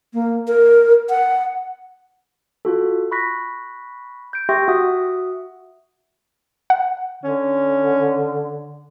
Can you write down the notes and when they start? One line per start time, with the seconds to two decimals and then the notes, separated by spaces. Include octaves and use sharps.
0.13 A#3
0.48 A#4
1.09 F#5
2.65 F4 F#4 A4
3.11 B5 C#6 F#6 A#6 B6
4.33 G6 D7
4.49 G4 E5 G5 C6 C#6 A#6
4.68 F#4 E5 F#5 D#6
6.70 F#5
7.24 D3 C#4